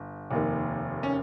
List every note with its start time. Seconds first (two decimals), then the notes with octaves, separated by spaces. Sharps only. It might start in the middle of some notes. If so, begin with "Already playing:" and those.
Already playing: G1
0.31 F1 D#2 D#3 A#3
1.03 C#4